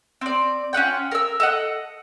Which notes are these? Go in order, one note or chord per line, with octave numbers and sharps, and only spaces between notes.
C4 D5
C#4 F4 F#5 G5
A#4 E6
A4 D#5 F#5